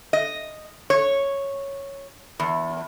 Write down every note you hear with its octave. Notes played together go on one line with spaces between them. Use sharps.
D#5
C#5
E2